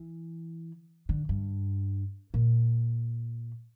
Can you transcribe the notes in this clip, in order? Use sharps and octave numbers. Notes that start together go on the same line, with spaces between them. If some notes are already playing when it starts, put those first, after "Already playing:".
Already playing: E3
D3
G2
A#2